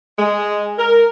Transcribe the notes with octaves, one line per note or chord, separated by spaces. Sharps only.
G#3
A#4